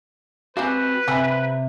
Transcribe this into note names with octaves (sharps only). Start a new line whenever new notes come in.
G#3 C4 F#4 G4 B4 F5
C3 C4 E5 F#5 G#5